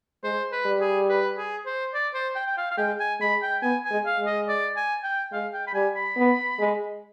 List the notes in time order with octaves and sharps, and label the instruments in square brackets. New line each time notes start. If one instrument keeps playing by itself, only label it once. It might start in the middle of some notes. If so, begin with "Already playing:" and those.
[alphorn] G#3 [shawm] C5
[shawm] B4
[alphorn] G3
[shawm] G#4
B4
G#4
C5
D5
C5
G5
G5
F5
F5
[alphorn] G#3 [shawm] G5
[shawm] G#5
[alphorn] G#3 [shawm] B5
[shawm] G5
[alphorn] B3 [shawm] G#5
[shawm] G#5
[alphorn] G#3
[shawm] F5
[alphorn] G#3
[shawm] D#5
D5
G#5
G5
[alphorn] G#3 [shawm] F5
[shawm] G5
B5
[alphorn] G3 [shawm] G#5
[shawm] B5
[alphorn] B3
G#3